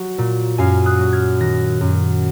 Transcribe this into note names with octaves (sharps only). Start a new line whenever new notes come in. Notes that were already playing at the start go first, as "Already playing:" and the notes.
Already playing: F#3 F#5
A#2
F#2 F5 G#5
D#6 F#6
F#3
F6 G#6
D#3 F#6 A#6
F#2